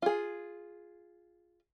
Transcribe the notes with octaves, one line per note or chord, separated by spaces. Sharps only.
F4 G#4